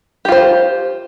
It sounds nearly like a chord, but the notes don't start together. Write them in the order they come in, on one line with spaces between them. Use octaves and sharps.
G4 F4 C5